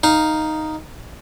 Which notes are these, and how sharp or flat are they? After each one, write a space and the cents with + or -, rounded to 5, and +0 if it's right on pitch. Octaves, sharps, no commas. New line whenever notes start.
D#4 +0 F5 +0